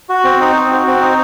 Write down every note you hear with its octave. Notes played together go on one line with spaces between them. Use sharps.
F#4
C4
D#4
C4
F#4
C4
D#4